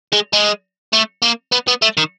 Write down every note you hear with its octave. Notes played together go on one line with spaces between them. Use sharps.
G#3
G#3
A3
A#3
B3
B3
A3
D#3